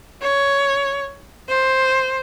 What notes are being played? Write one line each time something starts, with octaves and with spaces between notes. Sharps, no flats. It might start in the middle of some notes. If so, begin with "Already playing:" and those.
C#5
C5